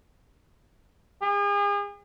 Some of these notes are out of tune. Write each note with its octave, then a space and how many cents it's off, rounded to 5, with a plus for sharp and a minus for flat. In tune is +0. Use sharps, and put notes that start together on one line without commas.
G#4 -40